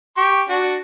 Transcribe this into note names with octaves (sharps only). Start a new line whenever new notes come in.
G4 C#6
D4 F#4